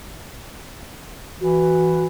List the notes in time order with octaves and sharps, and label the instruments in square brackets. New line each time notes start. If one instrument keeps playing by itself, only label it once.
[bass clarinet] E3 [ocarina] F#4